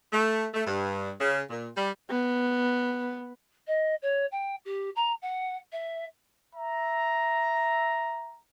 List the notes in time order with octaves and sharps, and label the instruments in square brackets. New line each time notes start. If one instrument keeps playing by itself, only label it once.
[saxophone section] A3
A3
G2
C#3
A#2
G3
[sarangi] B3
[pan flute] D#5
C#5
G5
G4
A#5
F#5
E5
[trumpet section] E5 A#5